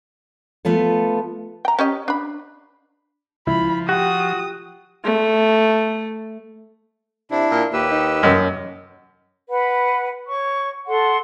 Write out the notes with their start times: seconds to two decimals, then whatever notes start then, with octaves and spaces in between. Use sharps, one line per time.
0.65 F3 A3 B3 F4 A4
1.65 G5 A#5
1.79 C#4 G4 D#5
2.08 D4 B5
3.47 C#2 F3 E4 B5
3.89 F#4 G4 G5 D#6
5.05 A3
7.31 C3 D4 E4
7.51 A#2
7.73 D#2 G4 B4 E6
7.91 D#4
8.23 F#2 D#5
9.49 B4 F#5 B5
10.27 C#5 C#6
10.88 A4 F#5 C6